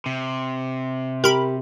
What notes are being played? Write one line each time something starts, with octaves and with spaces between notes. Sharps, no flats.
C3
G4 A#4 B5